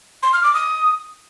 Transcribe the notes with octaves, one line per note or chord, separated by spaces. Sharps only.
C6
F6
D6
D#6